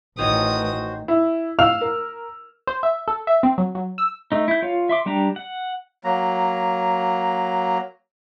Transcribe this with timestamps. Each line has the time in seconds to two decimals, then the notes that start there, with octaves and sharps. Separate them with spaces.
0.19 A1 D#3 F#4 C5 C#5 G#5 D#6
1.08 E4
1.59 F5 E6 F6 F7
1.81 A#4
2.67 C5
2.83 E5
3.08 A4
3.27 E5
3.43 C4
3.58 F#3
3.75 F#3
3.98 E6
4.32 A3 D#4
4.48 E4 G6
4.62 F4 C#5 F5
4.89 E5 C6 D6
5.06 G3 D4 G4 A#5
5.36 F#5
6.04 F#3 A#3 A#5